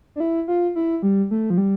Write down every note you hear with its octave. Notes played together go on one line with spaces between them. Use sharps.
D4
E4
F4
E4
G3
A3
F3
G3